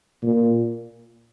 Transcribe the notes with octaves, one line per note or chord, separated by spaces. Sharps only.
A#2